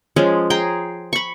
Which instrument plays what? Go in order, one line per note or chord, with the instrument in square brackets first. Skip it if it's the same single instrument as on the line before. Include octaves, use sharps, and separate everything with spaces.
[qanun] F3 G#3 C#4
G#4 G5 A#5 C6
B5 C#6